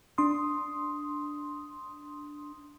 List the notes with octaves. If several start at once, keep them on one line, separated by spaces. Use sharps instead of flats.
D4 C6 D#6